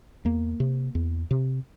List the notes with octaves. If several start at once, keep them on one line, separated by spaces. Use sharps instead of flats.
E2 A#3
C3
E2
C3